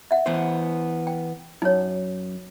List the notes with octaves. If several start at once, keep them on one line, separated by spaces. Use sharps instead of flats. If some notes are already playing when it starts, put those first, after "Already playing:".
E5 F#5
E3 B3 C5
G5
F#2 D#4 C#5